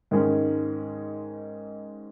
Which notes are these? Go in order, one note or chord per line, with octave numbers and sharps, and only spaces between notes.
G#2 D#3 G#3 C#4